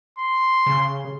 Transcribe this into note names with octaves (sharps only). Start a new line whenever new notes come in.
C6
C#3